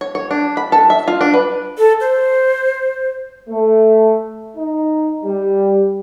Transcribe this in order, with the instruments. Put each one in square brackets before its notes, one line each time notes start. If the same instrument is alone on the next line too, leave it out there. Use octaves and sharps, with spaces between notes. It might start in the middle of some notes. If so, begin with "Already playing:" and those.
[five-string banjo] C#5
C#5
D4
B5
A4
E5
F4
D4
B4
[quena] A4
C5
[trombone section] A3
D#4
G3